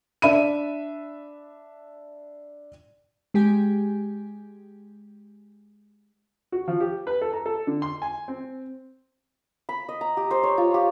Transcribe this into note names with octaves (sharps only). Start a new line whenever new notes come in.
D4 E5 B5 D#7
G#3 G4 G5 G#5
F#4
F3
G4
B4
A4
A#5
A4
D3
C6
G#5
C4
B5
D#5
A#5
G4
C5
C#5
F4
G4